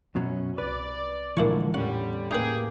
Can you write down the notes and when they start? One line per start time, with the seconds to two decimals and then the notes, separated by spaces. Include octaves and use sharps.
0.15 F#2 B2 F#3 C#4
0.58 C2 B4 D5
1.37 A#2 D3 E3 F3 G#3 A#3 E4 C#6
1.74 E2 A2 D3 G3 C#4 F#5
2.31 A2 A#3 D#4 G4 G#4 B4